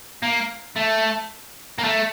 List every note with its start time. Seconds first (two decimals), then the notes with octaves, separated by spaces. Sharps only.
0.23 A#3
0.77 A3
1.78 A#3
1.84 A3